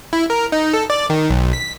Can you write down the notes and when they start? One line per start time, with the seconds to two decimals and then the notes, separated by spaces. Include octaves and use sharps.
0.13 E4
0.30 A#4
0.52 D#4
0.74 A4
0.90 D5
1.10 D#3
1.29 B1
1.53 B6